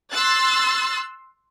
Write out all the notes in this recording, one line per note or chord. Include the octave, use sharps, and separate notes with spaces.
C6 E6 F#6 A6